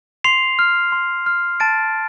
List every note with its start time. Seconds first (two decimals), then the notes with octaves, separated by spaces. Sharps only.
0.24 C6 C7 F7
0.59 F6
0.92 C6
1.26 F6
1.60 A5 A6 D7